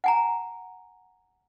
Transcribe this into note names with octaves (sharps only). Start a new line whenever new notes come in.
F#5 G#5 A#5